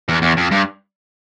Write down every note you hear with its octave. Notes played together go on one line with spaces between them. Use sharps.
E2
E2
F2
G2